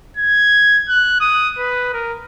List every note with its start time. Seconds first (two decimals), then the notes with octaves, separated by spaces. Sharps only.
0.17 G#6
0.88 F#6
1.20 D#6
1.58 B4
1.93 A#4